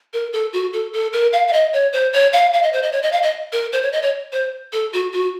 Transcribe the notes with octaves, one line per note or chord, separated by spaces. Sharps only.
A#4
A4
F#4
A4
A4
A#4
F5
F5
D#5
C#5
C5
C#5
F5
F5
D#5
C5
D#5
C#5
D#5
F5
D#5
A#4
C5
C#5
D#5
C#5
C5
A4
F#4
F#4